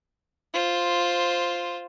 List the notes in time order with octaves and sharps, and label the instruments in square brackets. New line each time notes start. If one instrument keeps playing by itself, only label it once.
[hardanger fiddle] F4 C5